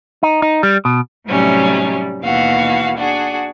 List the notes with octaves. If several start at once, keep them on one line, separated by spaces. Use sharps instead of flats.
D#4
D#4
G3
B2
A2 C3 F#3 G3 C#4 D#4
D#2 B2 E3 F#4 F5
D4 F#4 G#4